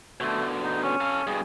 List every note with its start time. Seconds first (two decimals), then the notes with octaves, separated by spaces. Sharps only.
0.20 B2 D3 A3
0.63 D#4
0.82 C#4
1.01 A4 F5
1.27 G2 B2 G#4